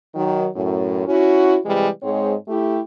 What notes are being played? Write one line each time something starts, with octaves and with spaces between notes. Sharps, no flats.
D#3 F#3
F#2 A2
C#4 E4 F#4
C3 E3 G3 G#3
G#2 G#3 C4 C#5
A3 E4 G4